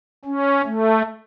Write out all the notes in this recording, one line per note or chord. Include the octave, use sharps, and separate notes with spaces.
C#4
A3